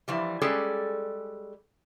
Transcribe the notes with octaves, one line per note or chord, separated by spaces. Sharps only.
E3 F3 G3
G3 G#3 C#4 G#4 A4 D5